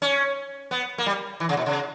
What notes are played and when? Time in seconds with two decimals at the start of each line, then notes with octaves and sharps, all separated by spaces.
0.02 C#4
0.71 B3
0.98 A#3
1.06 G3
1.40 E3
1.49 C#3
1.57 B2
1.66 C#3